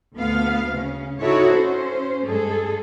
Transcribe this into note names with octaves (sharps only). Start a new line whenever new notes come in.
D2 B3 F5
C#3 C#4
D#4 E4 F#4 A4 C#5
C#4 C5
G2 G#3 G#4 A4